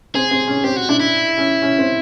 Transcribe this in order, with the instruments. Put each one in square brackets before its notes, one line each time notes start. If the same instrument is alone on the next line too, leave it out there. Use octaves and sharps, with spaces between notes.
[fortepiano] C4 [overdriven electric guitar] G#4
[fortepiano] C4
C#4
[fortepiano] C4 [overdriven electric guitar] G4
[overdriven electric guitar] F#4
[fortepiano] D4 [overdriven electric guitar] E4
[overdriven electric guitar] E4
[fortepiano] C#4
C#4
C4